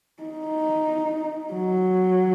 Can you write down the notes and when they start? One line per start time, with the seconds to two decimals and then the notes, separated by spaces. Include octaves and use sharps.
0.23 D#4
1.54 F#3